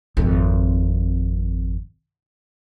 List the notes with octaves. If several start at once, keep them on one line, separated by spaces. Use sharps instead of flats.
G#1 F2